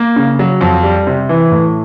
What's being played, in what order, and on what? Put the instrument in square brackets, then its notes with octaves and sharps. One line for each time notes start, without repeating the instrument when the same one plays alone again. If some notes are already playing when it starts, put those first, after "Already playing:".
Already playing: [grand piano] A#3
C#3
F#3
F2
G3
C3
E3
A2